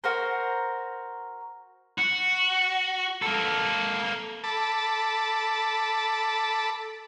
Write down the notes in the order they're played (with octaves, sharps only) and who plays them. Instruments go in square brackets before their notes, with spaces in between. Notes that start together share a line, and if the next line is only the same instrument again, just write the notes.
[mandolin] F#4 A#4 C5
[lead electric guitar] F#4
A#3 A4
[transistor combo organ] A4 A5 B5 D6